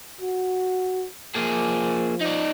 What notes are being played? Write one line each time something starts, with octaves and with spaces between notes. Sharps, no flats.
F#4
F3 A#3 G#4
D#4 D5